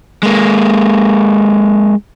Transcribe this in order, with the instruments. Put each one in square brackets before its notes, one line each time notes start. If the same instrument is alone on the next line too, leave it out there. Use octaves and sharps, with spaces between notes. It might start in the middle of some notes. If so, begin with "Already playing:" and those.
[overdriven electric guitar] G#3 A#3